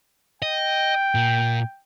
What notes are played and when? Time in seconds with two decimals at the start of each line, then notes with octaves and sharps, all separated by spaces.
0.42 D#5 G5
1.15 A#2